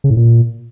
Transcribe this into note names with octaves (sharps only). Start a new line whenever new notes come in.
C#3
A2
A#2